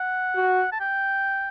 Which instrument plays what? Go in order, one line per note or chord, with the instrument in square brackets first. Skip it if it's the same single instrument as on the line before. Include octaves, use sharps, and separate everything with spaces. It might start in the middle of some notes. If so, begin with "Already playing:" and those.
Already playing: [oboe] F#5
[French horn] F#4
[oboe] A5
G5